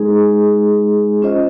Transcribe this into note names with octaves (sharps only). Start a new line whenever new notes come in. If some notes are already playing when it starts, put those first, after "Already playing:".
Already playing: G#3 D#4 G#4
C#4 F4 C5 D#5